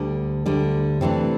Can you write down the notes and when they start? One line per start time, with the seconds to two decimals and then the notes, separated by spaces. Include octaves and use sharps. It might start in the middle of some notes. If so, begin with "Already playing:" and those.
Already playing: D2 D3 G3
0.46 D2 D3 G3
1.01 C3 E3 A3 D4